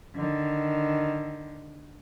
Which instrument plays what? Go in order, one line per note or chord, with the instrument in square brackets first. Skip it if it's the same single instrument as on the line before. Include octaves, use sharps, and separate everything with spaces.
[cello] D3 D#3